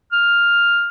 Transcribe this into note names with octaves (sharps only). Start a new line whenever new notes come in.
F6